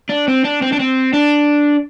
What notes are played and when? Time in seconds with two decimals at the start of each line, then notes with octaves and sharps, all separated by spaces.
0.10 D4
0.28 C4
0.44 D4
0.62 C4
0.72 D4
0.79 C4
1.13 D4